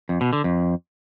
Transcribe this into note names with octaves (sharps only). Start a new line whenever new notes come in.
F2
B2
D3
F2